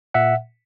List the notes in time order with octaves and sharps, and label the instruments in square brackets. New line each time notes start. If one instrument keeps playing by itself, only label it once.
[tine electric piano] A#2 E5 F#5